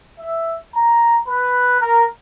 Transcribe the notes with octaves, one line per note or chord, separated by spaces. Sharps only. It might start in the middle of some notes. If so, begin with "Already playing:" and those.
E5
A#5
B4
A#4